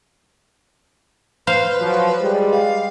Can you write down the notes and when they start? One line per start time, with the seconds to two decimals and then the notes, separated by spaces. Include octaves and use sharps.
1.47 B4 C5 F5
1.80 F3 F#3
2.20 G3 G#3
2.51 F5